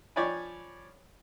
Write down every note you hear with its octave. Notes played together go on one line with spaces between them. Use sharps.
F3 C#5 D5 G5 G#5 B5